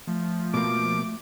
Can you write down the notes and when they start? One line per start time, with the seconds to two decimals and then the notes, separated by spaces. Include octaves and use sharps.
0.08 F3 A3
0.54 B2 A#3 D6